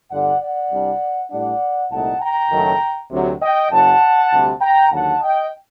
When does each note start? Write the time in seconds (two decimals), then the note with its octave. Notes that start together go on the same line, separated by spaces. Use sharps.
0.11 G1 G2 D3 D5 F#5
0.41 D5 F#5
0.71 C2 C3 G3 D4
1.31 A2 G3 D4 D5 F#5
1.91 C2 A#2 A3 D#4 F#5 A5
2.21 G5 A#5
2.51 F#1 F#2 D#3 F#3 A3
3.11 D2 C3 F#3
3.42 D#5 G5
3.71 F#1 F#2 F#3 F#5 A5
4.31 D2 C3 G3
4.61 G5 A#5
4.91 D#2 D3 F#3 F#5 A5
5.21 D#5 G5